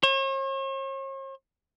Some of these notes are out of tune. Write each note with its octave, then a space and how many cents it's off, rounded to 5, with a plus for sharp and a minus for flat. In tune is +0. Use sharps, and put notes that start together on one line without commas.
C#5 -45